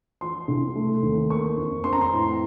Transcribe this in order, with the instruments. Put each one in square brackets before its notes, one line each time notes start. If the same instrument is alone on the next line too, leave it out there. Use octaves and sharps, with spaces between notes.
[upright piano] F3 C6
C2
A3
D#2
A#3 C#6
F2
C4 C6
A#5
C6
A2